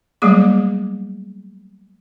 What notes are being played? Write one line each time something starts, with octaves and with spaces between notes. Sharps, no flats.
F#3 G3 A3 A#3 G#4 D6